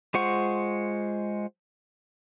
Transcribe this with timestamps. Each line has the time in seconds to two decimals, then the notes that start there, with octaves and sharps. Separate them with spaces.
0.14 G#3 F4 C5 F#5 C#6